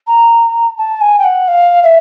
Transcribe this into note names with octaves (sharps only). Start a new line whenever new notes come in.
A#5
A5
G#5
G5
F#5
F5
E5